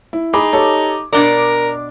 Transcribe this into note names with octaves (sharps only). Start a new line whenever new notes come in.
E4
D#4 G#4 B5 D6
G4 A4 C#5
B2 D4 A#4 D5 D6